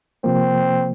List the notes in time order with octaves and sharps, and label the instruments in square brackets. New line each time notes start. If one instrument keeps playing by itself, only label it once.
[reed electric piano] C3 F3 A#3 [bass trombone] C4